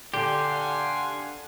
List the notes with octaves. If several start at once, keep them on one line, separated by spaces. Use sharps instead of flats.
D3 G4 F5 F#5 G#5 C6